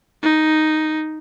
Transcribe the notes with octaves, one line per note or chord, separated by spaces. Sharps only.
D#4